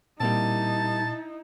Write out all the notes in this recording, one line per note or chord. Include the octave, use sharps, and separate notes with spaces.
A#2 G3 A#3 C4 D#4 E4 A5